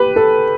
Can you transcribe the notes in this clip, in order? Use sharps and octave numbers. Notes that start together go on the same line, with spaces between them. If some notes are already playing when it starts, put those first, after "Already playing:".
Already playing: G4 B4
A4